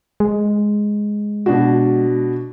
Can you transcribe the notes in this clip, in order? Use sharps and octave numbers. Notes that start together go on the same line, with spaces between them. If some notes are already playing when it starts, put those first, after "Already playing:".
G#3
B2 D4 F#4